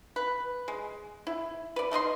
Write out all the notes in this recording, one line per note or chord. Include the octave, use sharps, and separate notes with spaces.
B4
G#3
E4
B4 D5
A3 D#4 D#5 C6